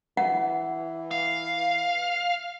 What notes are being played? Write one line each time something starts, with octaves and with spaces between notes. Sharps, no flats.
E3 F#5
F5